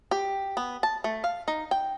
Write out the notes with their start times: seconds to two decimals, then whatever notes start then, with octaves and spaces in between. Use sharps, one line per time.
0.11 G4
0.57 B3
0.83 A5
1.04 A3
1.24 F5
1.48 D#4
1.71 G5